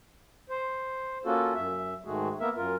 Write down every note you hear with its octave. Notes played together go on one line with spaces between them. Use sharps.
C5
A#3 C#4 F4 F#4 A4
F#2 E5
G#2 D#3 G#3 A3 F#4 G#4
A#3 B3 A#4 E5
F#2 F4 A#4